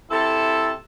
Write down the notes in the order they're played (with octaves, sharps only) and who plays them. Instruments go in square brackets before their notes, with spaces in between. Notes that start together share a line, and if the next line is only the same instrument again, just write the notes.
[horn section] C3 E4 A4